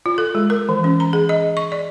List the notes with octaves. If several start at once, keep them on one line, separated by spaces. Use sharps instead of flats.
F4
A4
G#3
A#4
E3
C#4
A#5
G#4
D#5
C#6
D5